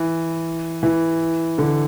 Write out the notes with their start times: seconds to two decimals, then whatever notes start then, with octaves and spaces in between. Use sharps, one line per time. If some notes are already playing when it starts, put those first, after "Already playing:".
Already playing: E3
0.83 E3
1.58 D3